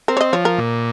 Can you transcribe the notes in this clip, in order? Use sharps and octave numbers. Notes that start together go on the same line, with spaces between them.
C4 A#4
C#5
D#5
F3 C#5
A#4
A#2